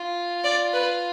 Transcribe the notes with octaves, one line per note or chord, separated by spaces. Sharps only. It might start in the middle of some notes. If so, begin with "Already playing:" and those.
Already playing: F4
D5
B4